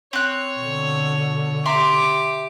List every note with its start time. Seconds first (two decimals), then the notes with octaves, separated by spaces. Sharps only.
0.13 C4 C#5 F#6
0.57 B2 D3
1.66 G4 E5 A#5 C6 D6